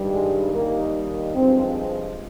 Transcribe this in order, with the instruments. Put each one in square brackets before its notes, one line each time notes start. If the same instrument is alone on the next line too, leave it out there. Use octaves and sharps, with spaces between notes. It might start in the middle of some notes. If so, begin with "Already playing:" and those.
Already playing: [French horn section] G2 D#3 G3
G#3
D#2 D#3 G3 A#3
G2 F3 G#3 C4